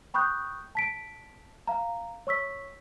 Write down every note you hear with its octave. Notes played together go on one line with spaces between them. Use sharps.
G5 B5 C#6 D#6 F#6 G6
A5 B6 D7
F5 A#5
C#5 C#6 E6 B6